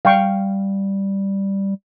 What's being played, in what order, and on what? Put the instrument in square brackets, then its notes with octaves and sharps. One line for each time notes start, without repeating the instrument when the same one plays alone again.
[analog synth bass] G3 [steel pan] F5 G5 C#6